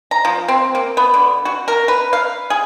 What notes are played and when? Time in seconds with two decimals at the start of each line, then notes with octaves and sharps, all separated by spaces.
0.11 A#5
0.25 F3
0.48 C4
0.75 A#3
0.97 B3
1.14 D3
1.45 F#4
1.68 A#4
1.88 B4
2.13 F5
2.50 G#4